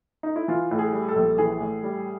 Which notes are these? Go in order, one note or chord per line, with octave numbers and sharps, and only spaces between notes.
D#4
E4
E3 F4
A2
G#4
G3
A4
A#1
E3 G#4
A2
G3